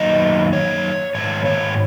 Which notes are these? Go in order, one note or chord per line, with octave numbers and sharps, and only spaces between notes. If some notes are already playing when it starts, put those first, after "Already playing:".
Already playing: F#2 D#3 F#3 A#3 D#4 D#5
C#5
G#2 D#3 G#3 C#5
C#5